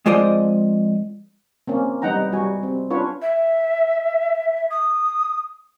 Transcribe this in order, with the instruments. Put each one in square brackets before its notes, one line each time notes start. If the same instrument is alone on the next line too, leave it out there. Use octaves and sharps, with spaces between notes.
[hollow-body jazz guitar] F2 G#3 F4 C5 D5 D#5
[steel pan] A#3 C4 C#4
G3 B3 D#4 F#5 G5 A#5
G3 F#4 G#5
C4
C#4 D4 F4 B4 C#5
[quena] E5
D#6